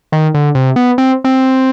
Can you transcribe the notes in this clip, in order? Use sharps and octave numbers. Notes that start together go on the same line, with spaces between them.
D#3
D3
C3
B3
C4
C4